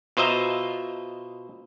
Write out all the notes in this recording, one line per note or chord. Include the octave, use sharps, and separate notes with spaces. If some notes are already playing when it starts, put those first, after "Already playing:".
B2 F4 C5 D#5 E5 A#5